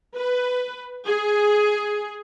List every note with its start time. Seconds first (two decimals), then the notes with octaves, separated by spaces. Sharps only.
0.15 B4
1.06 G#4